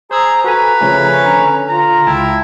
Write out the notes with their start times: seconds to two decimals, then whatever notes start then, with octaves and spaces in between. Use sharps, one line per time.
0.11 G#4 C5 A#5 E6
0.44 F#4 A4 B4 G#5 A#5
0.81 C#3 F3 A3 C#4
1.24 D3 A#5
1.69 F4 A#5
2.07 C#2 E4 G5 A5